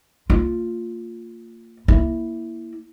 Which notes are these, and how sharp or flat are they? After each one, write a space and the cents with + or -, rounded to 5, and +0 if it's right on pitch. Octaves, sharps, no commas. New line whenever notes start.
A#3 -35 F4 +0
A#3 +15 E4 +0